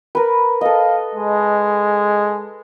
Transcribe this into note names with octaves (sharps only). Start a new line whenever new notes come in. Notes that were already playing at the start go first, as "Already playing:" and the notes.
A#4 B4
A4 D#5 F5
G#3